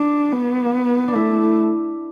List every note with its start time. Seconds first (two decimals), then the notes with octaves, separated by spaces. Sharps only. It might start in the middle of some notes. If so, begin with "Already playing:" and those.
Already playing: D4
0.32 B3
1.08 D4
1.15 A3 E4